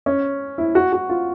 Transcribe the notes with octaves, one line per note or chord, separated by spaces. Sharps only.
C#4
E4
F#4
F#4
F4